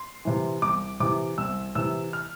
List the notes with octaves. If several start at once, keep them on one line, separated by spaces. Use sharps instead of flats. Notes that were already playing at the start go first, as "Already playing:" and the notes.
Already playing: C6
C3 E3
C2 D6
C3 E3 D6
C2 E6
C3 E3 E6
F6